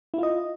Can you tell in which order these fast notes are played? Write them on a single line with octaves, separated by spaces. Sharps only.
E4 F4 D#5